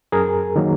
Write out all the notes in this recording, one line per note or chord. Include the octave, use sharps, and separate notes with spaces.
F#2 G#4 A#4
D#3 F#3 A#3